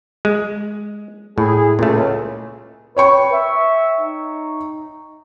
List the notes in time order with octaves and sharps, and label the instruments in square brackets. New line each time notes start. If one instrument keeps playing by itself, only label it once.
[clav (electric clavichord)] G#3
[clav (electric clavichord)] A2 [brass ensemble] E4 G#4
[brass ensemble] C#2 [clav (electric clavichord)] A#2 A3
[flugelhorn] B4 [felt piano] C#5 G5 C#6
[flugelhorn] E5
D#4